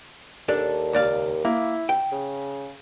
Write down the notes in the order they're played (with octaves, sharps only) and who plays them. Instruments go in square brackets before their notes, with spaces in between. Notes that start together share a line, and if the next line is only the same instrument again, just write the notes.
[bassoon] D#2 [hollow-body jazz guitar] D4 A4 D5
[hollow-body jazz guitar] C#2 D5 F5
[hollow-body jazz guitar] A#3 [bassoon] E4
[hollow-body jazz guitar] G5
[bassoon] C#3